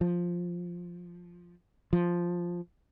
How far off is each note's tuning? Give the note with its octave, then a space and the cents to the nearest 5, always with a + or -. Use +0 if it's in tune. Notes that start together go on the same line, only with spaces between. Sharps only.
F3 +5
F3 +0